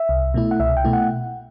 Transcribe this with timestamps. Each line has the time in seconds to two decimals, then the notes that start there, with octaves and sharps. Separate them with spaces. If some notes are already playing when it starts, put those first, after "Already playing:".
Already playing: E5
0.09 C2
0.34 B2 A3 E4
0.51 F#5
0.60 C2 E5
0.77 G5
0.84 B2 A3 E4
0.93 F#5